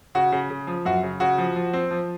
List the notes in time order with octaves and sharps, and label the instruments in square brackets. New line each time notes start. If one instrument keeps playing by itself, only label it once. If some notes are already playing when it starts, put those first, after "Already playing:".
[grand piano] C#3 F#4
C#3
C#3
F3
F#2 F#4
C#3
C#3 F#4
F3
F3
C4
F3